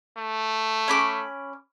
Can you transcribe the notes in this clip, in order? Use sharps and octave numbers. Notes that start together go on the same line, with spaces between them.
A3
C#4 B5 D6